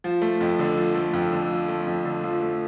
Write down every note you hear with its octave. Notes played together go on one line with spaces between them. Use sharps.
F3
A3
F2
D3
F3
A3
F2
D3
F3
A3
F2
D3
F3
A3